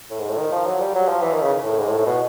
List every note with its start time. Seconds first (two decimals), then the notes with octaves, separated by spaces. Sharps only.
0.10 A2
0.19 G#2
0.29 A2
0.38 D#3
0.52 F3
0.66 F#3
0.80 G3
0.95 F#3
1.08 F3
1.22 E3
1.32 D#3
1.41 C#3
1.64 A2
1.78 G#2
1.87 A2
1.98 A2
2.06 B2